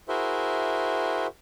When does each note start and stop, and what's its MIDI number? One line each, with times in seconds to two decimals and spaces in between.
0.08 1.27 64
0.08 1.27 66
0.08 1.27 68
0.08 1.27 70
0.08 1.27 72
0.08 1.27 76